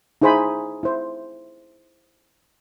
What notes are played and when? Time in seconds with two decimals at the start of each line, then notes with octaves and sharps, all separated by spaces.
0.22 D#4 E4 G#4 C5 G#5 B5
0.83 E4 C5